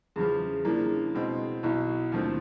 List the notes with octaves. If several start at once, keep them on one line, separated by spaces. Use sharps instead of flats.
E2 C#3 F3 G#4
C#3 F3 A#3 D4 E4
B2 G#3 C4
B1 B2 F#3 E4
D#2 D3 F3 A3 C4